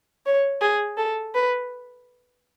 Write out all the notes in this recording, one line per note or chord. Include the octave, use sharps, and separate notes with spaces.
C#5
G#4
A4
B4